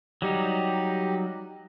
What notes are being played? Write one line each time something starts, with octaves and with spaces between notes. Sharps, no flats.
F#3 G3 D#4 G4